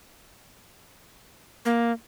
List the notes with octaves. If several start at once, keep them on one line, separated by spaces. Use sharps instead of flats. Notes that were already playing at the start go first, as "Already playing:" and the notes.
A#3